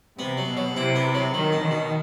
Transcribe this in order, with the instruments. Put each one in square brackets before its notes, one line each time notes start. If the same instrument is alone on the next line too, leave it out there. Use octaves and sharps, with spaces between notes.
[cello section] C3 [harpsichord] B3
[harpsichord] F#3
[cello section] B2
[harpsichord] F#3
[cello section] C3 [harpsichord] E4
[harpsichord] B3
F#3
[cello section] D#3 [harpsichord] F#3
[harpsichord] B2
[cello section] D#3
[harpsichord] B2